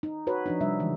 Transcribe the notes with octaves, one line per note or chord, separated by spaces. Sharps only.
D#4
F#4 B4 C#5
F3 D4 D#4
C3 G3 D4 E5
C#3 E3 G#3